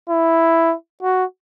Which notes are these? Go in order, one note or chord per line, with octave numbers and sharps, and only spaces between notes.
E4
F#4